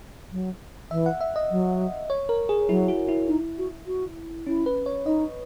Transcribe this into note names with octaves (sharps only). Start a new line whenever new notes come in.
F#3
E3 E5
F#5
E5
D#5
F#3
C#5
A#4
G#4
F#3 E4
F#4
E4
D#4
F#4
F#4
C#4 E4
B4
C#5
D#4 D#5